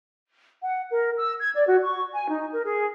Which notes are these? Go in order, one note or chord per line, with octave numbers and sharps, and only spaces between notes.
F#5
A#4
E6
G#6
D5
F#4
C#6
G#5
D#4
A#4
G#4